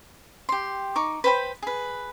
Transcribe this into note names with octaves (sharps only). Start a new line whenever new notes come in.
G4 C6
D#4 C#6 D6
B4 C5 G5 B5
G#4 B4